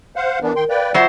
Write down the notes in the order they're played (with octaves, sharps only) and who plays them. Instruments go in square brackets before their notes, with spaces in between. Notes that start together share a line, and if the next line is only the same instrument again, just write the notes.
[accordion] C5 F5 F#5
[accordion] E3 B3 D4 [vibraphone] A#4
[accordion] D#3 G5 C6
[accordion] B4 D5 G5 [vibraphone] F5
[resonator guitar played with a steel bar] F#3 C5 [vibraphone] F4 E5 [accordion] D5